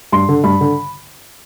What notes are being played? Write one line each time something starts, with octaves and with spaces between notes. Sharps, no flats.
G2 C6
D3
G2 B5
D3